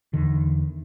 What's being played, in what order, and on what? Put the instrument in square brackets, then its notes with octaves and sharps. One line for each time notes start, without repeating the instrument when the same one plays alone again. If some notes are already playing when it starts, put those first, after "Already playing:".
[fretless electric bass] E2 D3 D#3